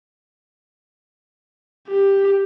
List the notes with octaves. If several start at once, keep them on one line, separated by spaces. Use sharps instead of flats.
G4